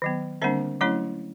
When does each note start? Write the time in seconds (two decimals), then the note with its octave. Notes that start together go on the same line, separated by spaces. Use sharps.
0.02 D#3 F#3 B3
0.42 D3 G3 A#3 C4 D4 C5
0.81 F#3 A3 C#4 E4 C#5